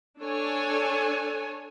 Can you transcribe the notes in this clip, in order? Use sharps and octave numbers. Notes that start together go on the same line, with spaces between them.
D4 A4 C#5 G#5